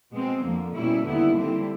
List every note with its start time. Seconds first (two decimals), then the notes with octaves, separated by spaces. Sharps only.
0.12 B2 G#3 C4
0.43 F2 D3 F3 A#3
0.74 B2 G3 A#3 C#4 E4
1.05 D#2 D3 G3 B3 E4
1.36 D3 G3 C4 E4